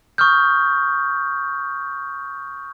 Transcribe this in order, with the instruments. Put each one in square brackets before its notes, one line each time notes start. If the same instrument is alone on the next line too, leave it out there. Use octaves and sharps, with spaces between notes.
[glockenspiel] C#6 D#6 F6 G6